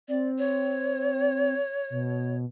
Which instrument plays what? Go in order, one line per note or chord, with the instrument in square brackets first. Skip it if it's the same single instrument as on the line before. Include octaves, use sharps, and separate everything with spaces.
[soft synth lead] C4 [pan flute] D5
[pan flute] C#5
[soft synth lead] B2